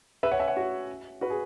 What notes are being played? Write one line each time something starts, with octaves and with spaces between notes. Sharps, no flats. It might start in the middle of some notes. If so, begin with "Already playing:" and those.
B4 E5
C#5 F#5
E5 G#5
C#5 F#5
F#4
F#4 B4
G#4